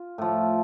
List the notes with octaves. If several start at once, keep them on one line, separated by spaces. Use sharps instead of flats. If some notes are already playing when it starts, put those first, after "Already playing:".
Already playing: F4
A2 F3